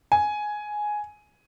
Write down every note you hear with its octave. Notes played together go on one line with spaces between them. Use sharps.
G#5